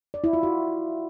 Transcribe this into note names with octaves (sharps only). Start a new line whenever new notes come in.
D5
E4
F4
F#4